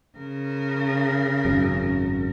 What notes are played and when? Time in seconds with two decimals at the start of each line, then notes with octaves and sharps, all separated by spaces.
0.18 C#3 A#4
1.45 G#1 F#2